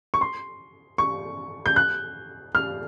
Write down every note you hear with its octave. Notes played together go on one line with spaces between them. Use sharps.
C#6
C6
C#6
G6
F#6
F6